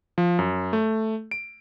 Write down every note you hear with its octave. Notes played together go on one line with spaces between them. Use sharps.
F3
F#2
A3
D7